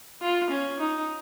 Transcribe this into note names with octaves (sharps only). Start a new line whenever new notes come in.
F4
C#4
D#4